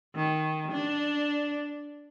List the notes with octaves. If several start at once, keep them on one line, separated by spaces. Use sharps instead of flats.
D#3
D4